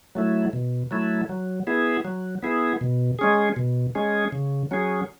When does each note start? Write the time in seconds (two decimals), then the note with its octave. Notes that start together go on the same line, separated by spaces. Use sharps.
0.15 F#3 A3 E4
0.53 B2
0.91 F#3 A3 E4
1.29 F#3
1.67 B3 E4 G#4
2.05 F#3
2.43 B3 E4 G#4
2.81 B2
3.19 G#3 C#4 G#4
3.56 B2
3.95 G#3 C#4 G#4
4.32 C#3
4.71 F#3 C#4 G#4